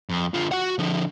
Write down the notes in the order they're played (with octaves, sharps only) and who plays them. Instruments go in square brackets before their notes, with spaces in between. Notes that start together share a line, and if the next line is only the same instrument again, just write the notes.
[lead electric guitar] F2
D3 F4
F#4 F#5
D3 F3